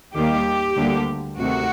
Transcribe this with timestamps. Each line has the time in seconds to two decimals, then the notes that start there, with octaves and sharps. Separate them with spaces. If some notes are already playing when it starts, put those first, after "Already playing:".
0.14 D#2 D#3 G3 A#3 G4
0.76 D2 D3 G3 A#3
1.38 D2 C3 D#3 F#4